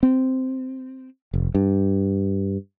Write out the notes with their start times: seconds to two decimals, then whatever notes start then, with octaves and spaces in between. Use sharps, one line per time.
0.03 C4
1.34 F1
1.55 G2